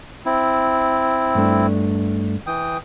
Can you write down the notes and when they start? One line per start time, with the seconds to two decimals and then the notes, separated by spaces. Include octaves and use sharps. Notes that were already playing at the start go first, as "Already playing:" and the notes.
0.26 C4 E4
1.35 G2 A3 D4
2.47 E3 G5 D#6